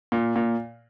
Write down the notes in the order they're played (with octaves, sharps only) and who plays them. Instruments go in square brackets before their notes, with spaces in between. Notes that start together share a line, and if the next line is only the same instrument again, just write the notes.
[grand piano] A#2
A#2